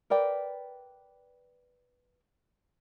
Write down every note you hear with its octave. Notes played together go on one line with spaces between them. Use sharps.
A#4 B4 D5 G5